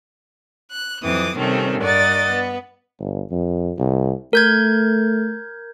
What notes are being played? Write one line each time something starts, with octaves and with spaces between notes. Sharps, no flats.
F#6
F2 E3 F#3 C4 D6 D#6
C3 D#3 G3 A3 C4 C#4
G2 A#4 D5 D#5 F#5 A6
B3
G1
F2
C2
A3 A#4 G6 G#6